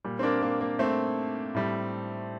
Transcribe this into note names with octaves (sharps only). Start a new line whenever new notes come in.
A#2 G3
C4
A#3 D4
A#3
A#3
A3 C4
A2 G3